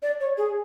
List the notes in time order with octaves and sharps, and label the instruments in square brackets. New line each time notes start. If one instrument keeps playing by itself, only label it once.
[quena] D5
C#5
G#4